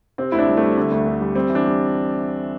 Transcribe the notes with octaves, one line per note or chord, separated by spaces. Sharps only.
C3 C4
D2 E4
D4
G3
A3
G3
D3
D2
D2
G3
G3 C4
E3
D4
G3